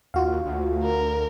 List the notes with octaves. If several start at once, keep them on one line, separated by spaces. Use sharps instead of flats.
D#2 F4 F#4 F5
D2
A#4